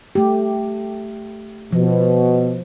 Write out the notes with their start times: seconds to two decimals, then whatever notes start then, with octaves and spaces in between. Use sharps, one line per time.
0.15 A3 G4
1.73 B2 F3